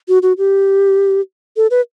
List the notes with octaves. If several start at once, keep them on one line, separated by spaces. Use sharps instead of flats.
F#4
F#4
G4
A4
B4